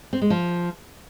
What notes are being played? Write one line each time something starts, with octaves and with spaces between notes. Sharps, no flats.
C4
G#3
F3